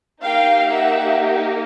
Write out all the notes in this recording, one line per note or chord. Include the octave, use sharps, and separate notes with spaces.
A#3 D#4 G4 F5 G5
E5 F#5